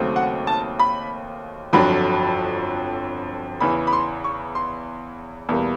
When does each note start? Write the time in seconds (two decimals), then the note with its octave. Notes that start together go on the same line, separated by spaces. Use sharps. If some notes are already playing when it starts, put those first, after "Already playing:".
Already playing: D#2 C#3 F#3 A3 C4
0.16 F#5
0.47 A5
0.79 B5
1.73 G1 F2 D3 F#3 B5
3.60 E2 C#3 E3 B5
3.87 B5
3.93 C6
4.24 C#6
4.55 C6
5.49 E2 B2 G3 A#3